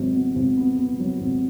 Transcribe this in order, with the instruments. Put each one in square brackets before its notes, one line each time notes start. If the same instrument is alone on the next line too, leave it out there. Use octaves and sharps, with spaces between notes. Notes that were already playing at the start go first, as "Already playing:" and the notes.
Already playing: [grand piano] G#1 F#3
B3
G#1
B3
B3
F#3
G#1